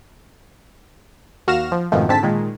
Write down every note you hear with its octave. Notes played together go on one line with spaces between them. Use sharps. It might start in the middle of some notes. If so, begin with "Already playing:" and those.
D#2 F#4 F5 F6 A#6 E7
F3
F2 G#2 B2 D#3 F3 A3
G#2 D3 C4 A5 B6
A#2 D#3 G#3